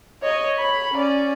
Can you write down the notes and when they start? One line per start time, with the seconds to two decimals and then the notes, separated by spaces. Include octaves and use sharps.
0.22 C#5 D#5
0.58 C#5 B5
0.94 C#4 D5